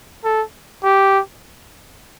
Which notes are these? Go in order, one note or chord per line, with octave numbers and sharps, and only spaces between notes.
A4
G4